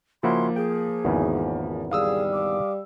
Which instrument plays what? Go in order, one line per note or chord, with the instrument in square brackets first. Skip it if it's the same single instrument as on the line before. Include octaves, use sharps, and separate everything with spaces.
[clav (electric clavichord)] C#3 E4 F#4 [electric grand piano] F3 A#3 [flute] C6
[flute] G#4 [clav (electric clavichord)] G5
[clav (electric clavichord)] G#1 E2 C#3
[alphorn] G3 [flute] G#4 [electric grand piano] F5 D#6 E6
[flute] D6